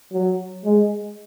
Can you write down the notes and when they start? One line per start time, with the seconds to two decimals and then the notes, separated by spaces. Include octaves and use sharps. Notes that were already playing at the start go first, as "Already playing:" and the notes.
0.13 F#3
0.65 G#3